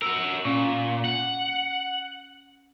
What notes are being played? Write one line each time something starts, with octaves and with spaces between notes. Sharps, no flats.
F#4 A#4 E6
A#2 C#4
F#5